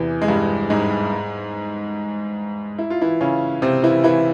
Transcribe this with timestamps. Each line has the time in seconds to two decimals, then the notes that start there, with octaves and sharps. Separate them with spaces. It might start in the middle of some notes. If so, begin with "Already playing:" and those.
Already playing: E2 C3 E3
0.22 G#3
0.28 G2 G3
0.70 G#2 G#3
2.79 E4
2.90 F4
3.02 E3 E4
3.21 C#3 C#4
3.62 C3 C4
3.83 E3 E4
4.04 E3 E4